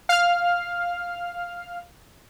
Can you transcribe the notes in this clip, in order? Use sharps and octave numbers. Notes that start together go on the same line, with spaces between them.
F5 F6